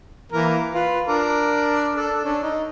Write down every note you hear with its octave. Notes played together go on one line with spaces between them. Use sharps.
E3 A#3 A#4
F4 B4
D4 A#4 D6
D4 A4
C#4 D4
D#4